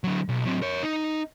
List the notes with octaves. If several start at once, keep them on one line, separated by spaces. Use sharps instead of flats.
D3 F#3
B1
F#3 C4
A#4 C#5
D#4